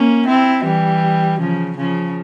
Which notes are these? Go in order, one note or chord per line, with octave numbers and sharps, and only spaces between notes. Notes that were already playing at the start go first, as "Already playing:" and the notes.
Already playing: A#3 C#4
C4 E4
E3 G3
C#3 F3
C#3 F3